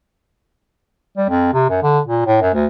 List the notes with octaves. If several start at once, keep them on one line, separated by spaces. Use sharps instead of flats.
G3
F2
C3
F#2
D3
A#2
A2
F#2
D2